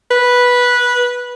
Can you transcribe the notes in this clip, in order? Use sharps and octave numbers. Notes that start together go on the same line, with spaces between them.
B4